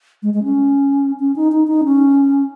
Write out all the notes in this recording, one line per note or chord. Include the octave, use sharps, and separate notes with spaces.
G#3
G#3
C#4
C#4
D#4
D#4
D#4
C#4